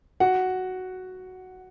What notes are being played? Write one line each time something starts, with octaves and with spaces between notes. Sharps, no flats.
F#4 F#5